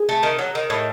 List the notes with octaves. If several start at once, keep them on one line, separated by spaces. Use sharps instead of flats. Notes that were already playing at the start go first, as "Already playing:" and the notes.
Already playing: G#4
A3
D#3
F#3
D#3
A2